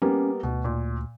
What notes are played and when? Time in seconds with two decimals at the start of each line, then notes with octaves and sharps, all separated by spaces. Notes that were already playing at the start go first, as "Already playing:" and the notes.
0.02 G3 A#3 B3 C#4
0.43 D2 B2
0.64 A#2